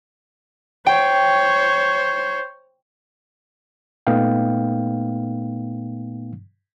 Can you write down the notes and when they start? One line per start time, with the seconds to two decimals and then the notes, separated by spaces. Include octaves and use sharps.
0.86 C5 C#5 G5
4.07 A#2 A3 B3 D#4 F5 G5